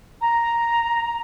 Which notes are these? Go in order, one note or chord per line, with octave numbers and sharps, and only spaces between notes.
A#5